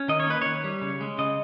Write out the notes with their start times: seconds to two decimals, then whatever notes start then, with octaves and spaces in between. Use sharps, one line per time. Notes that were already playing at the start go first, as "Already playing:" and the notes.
Already playing: C#4
0.08 D#3 D#5
0.20 C#5
0.27 A#3 B4
0.42 D#3 C#5
0.64 G3
0.82 C#3
1.01 G#3
1.18 C#3 D#5